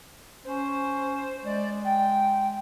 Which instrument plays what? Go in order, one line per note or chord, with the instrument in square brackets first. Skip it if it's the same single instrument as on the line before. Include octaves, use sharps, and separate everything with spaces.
[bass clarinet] C#4 [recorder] C5
[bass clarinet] G#3 [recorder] D5
[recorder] G5